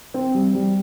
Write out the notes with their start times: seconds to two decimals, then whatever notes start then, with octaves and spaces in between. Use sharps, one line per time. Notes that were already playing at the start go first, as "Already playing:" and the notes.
0.14 C4
0.35 G3
0.55 G3